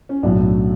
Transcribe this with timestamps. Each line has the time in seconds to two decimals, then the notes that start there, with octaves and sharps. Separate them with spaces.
0.09 C#4
0.23 B1 A2 F#3 A3 D4